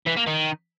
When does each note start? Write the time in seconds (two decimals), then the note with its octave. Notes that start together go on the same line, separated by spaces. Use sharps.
0.07 E3
0.17 A#3
0.27 D#3